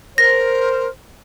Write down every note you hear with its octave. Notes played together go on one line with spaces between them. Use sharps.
A#4 C5 A#6